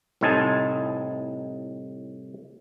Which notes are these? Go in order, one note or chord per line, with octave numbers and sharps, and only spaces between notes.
C2 A2 C4 D#4 G#5 A5